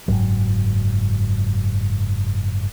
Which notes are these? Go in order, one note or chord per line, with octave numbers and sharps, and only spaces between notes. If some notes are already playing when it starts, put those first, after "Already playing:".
F#1 C2 G#2 F#3